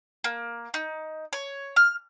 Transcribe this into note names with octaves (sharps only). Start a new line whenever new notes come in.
A#3
D#4
C#5
F6